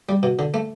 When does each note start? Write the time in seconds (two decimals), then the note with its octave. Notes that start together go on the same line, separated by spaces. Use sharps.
0.09 G3
0.23 B2
0.39 D3
0.54 A3